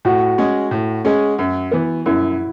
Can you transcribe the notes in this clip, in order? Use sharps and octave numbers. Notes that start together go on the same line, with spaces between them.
A2 F#4
G#3 C#4 G#4
A2
G#3 C#4 G#4
F#2
E3 B3
F#2 E4